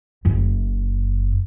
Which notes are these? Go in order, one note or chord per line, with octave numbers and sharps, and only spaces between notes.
F#1 F#2